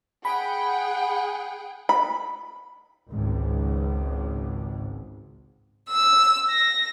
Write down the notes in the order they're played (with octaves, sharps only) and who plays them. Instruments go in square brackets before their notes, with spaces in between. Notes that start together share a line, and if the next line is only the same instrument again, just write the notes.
[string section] G#4 F#5 G5 [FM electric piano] B5
[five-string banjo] B5
[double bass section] G#1 C#2 G#2
[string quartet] E6
A#6